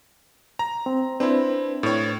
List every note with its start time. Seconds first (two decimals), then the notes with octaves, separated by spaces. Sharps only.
0.59 A#5
0.86 C4
1.20 C4 D4 E4 B4 C5
1.83 A2 C#5